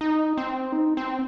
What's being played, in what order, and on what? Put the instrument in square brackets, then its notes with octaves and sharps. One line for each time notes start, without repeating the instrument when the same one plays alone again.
[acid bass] D#4
C4
D#4
C4